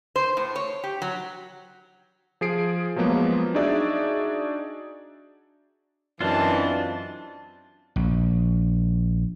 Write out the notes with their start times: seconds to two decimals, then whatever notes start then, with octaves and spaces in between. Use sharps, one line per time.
0.16 C5
0.37 A2
0.56 C#5
0.84 G4
1.02 F#3
2.41 F3 G#4 C7 D7
2.96 F3 F#3 G#3 A#3 B3
3.54 D4 D#4 F#4 G#4 D5 E5
6.21 F#2 E3 C4 D4 F4 D#5 A5
7.96 A#1